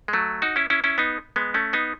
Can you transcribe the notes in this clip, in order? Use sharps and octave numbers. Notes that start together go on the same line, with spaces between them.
G#3
F#3 A3
D#4 F#4
C#4 E4
C#4 E4
C#4 E4
B3 D#4
G#3 B3
A3 C#4
B3 D#4